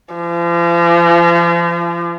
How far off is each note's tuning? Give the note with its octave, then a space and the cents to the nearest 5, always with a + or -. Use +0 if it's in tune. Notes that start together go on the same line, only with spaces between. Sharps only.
F3 -40